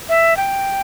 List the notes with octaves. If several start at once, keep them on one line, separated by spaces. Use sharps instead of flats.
E5
G5